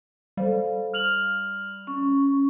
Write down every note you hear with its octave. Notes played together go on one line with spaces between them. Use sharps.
G3 A4 C5 F5
F6 F7 F#7
C#4 C#6